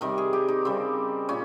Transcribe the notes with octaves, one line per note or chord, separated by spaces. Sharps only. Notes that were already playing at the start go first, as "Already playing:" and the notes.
C3 D#3 G3 A#4
G#4
G4
D#4
C#3 G3 C4
A#2 C#4